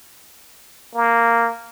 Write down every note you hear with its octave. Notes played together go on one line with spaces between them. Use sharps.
A#3